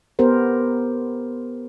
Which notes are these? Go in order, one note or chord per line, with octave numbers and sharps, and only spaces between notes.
B3 G4 A#4 C5